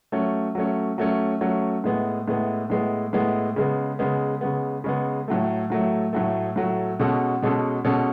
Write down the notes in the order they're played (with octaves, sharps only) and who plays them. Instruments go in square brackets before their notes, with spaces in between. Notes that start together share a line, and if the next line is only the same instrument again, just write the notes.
[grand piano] F#3 A3 C#4
F#3 A3 C#4
F#3 A3 C#4
F#3 A3 C#4
A2 G#3 B3
A2 G#3 B3
A2 G#3 B3
A2 G#3 B3
C#3 G#3 B3
C#3 G#3 B3
C#3 G#3 B3
C#3 G#3 B3
A2 F#3 A3
A2 F#3 A3
A2 F#3 A3
A2 F#3 A3
B2 G#3 C#4 F#4 A4
B2 G#3 C#4 F#4 A4
B2 G#3 C#4 F#4 A4